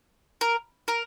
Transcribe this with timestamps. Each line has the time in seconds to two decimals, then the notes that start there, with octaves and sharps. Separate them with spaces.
0.41 A#4
0.88 A#4